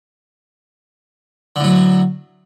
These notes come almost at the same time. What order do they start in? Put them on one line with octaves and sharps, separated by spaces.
D3 A2 F#3